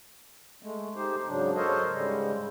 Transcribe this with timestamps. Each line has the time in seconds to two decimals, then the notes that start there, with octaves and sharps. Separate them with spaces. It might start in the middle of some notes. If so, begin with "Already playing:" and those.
0.63 G#3 A3
0.96 D#4 G4 C5
1.27 G#2 C#3 F#3 D4
1.56 A4 A#4 C5 C#5 D#5
1.92 G#2 C#3 G3 G#3